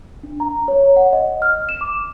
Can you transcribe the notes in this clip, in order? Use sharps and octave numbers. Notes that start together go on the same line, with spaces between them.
D4
A#5
C#5
F#5
D#5
F6
E7
D6